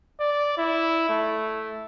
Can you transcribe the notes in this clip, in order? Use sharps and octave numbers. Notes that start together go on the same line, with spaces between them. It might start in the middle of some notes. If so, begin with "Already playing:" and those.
D5
E4
A3